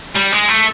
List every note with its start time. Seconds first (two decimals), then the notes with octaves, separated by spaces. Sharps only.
0.15 G3
0.32 G#3
0.48 A3